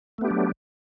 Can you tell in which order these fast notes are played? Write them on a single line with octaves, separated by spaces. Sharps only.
A3 B3 G4 D4 F#3